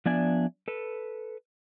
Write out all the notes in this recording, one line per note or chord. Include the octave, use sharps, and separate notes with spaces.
F3 B3 D4 D5 E5 G#5
A4 B4